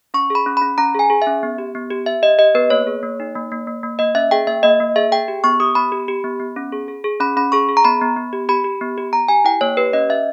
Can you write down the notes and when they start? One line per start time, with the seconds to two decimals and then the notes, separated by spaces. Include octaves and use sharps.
0.14 C#4 C#6
0.30 G#4 B5
0.46 C#4
0.57 C#4 B5
0.78 C#4 A#5
0.95 G#4 G#5
1.10 G#4
1.22 E5
1.27 C#4
1.43 B3
1.58 G4
1.75 B3
1.91 G4
2.06 G4 E5
2.23 G4 D#5
2.39 G4 D#5
2.54 B3 B4
2.70 A#3 C#5
2.87 G#4
3.03 A#3
3.20 D#4
3.35 A#3
3.52 A#3
3.67 A#3
3.83 A#3
3.99 A#3 D#5
4.15 C#4 E5
4.31 G#4 G5
4.47 A#3 E5
4.63 A#3 D#5
4.80 A#3
4.96 G#4 E5
5.12 G#4 G5
5.28 G4
5.44 B3 C#6
5.60 G4 D#6
5.75 B3 B5
5.92 G4
6.08 G4
6.24 B3
6.40 B3
6.56 C#4
6.72 G#4
6.88 G#4
7.04 G#4
7.20 C#4 B5
7.37 C#4 B5
7.52 G#4 C#6
7.69 G#4
7.77 A#5
7.84 B3 B5
8.01 B3
8.17 B3
8.33 G4
8.49 G4 B5
8.64 G4
8.81 B3
8.98 G4
9.13 G4 A#5
9.28 G4 G#5
9.45 E4 G5
9.61 A#3 C#5
9.77 G4 B4
9.93 C#4 D#5
10.09 C#4 E5